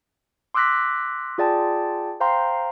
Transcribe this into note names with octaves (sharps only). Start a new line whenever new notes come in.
C6 D6 E6 F#6 A#6 B6
F4 G#4 D5 G5 A5
C5 F5 G5 A#5 C6